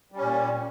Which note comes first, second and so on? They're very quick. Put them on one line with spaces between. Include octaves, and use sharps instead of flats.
G3 C#4 A#2